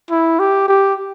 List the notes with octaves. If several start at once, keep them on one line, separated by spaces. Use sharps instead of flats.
E4
G4
G4